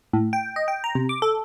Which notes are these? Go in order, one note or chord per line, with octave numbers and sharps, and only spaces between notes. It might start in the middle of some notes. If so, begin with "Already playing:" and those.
A2
G5
D#5
G5
A#5
C3
D6
A4